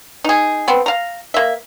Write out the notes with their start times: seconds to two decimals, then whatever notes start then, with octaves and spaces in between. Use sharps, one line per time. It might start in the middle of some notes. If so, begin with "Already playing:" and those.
0.24 D#4 G#4
0.68 B3 C4
0.86 F5 A#5
1.34 A#3 E5